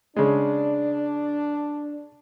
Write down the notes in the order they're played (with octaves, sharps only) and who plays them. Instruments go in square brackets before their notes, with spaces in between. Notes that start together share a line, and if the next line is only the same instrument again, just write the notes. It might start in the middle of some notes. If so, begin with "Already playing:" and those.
[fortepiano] C#3 G#3 [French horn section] D4